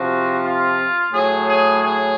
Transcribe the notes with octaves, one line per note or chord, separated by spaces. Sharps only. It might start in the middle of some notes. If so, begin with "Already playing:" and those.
Already playing: C3 F3 F#4
F4
A2 F#3 G#4
G#4
G#4